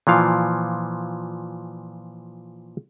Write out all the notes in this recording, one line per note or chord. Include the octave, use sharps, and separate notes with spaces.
A#2 E3 F3 F5